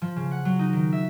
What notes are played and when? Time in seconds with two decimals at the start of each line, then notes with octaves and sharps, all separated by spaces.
0.02 F3
0.16 C#3
0.31 F#5
0.45 F#3
0.59 D#4
0.73 D#3
0.92 E5